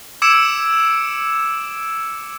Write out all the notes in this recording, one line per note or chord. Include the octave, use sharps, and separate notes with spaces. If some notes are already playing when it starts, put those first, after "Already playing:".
D6 E6 G#6 C#7 D7 E7